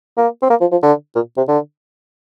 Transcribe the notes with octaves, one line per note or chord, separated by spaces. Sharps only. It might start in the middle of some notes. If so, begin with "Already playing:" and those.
A#3
C4
A#3
F3
F3
D3
A#2
C3
D3